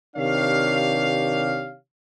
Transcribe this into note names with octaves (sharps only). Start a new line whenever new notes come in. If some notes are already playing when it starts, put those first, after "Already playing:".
C3 D#3 D4 G4 C#5 F5